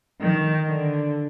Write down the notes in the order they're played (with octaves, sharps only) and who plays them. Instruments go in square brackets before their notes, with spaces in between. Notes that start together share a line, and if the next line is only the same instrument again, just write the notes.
[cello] D#3
D3